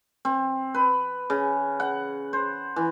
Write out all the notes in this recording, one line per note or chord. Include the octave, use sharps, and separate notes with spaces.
C4
B4
C#3
F#5
C5
E3